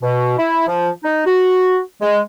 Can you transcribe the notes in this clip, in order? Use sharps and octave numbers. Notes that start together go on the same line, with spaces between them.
B2
E4
F3
D#4
F#4
G#3